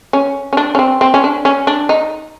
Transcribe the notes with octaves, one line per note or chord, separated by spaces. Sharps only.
C#4
C#4
D4
C#4
C4
C4
C#4
D4
C#4
D4
D#4